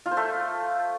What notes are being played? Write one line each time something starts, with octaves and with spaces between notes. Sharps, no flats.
F4
C5
A3